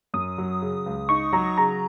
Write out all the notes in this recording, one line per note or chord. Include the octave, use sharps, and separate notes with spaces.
F#2 D#6
F#3
C#3
C#2
D#4 C#6
F#3 A#5
C#3 A#5